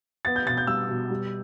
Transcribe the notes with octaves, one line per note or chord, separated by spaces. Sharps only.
B3 A6
G6
B2 A6
G6
G3 E6
B2
G3